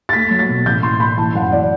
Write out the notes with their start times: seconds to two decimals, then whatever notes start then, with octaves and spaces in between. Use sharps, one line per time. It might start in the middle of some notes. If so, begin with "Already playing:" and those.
0.09 A6
0.13 A3 B6
0.31 F#3
0.39 A6
0.49 B2
0.66 A1 G6
0.82 E3 C6
1.00 A2 B5
1.17 E3 A5
1.35 F#2 F#5
1.52 E3 D5